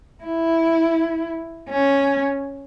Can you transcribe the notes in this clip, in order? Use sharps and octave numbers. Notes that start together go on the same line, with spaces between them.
E4
C#4